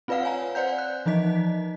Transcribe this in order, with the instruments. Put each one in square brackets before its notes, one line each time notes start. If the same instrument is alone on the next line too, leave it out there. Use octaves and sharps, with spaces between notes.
[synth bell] C4 F4 B4 D5 F5 F#5
C#5 G#5 A#5
C5 D5 F#5 G6
F#6
E3 F3 D#4 D#5 B6